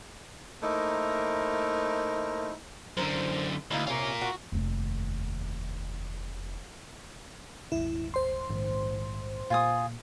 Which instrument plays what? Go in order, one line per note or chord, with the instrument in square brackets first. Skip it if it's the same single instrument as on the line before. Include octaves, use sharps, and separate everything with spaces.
[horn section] A3 A#3 D#4 E4 A#4 C5
[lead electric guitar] F#2 D3 [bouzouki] A#4 C5
[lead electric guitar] D2 [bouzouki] A#3 D#4 E4
[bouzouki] C3 C#4 [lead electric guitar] F4 A#4
[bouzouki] F#4
[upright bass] F1 D#2
[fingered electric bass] D#1 G#1 [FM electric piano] E4
[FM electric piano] C5 C6
[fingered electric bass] A#1 G#2 D#3
[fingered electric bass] A#2 [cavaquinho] F4 G#5 D#6